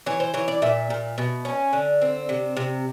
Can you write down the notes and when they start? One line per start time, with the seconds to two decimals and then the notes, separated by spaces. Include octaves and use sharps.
0.06 E3 C#5
0.20 C5
0.34 E3 C#5
0.48 D5
0.62 A#2 E5
0.90 A#2
1.18 B2
1.45 C#4
1.73 D3
2.02 C4
2.29 C3
2.57 C3